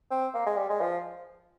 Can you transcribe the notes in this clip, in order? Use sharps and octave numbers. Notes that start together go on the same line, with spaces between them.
C4
A#3
G#3
G3
G#3
F3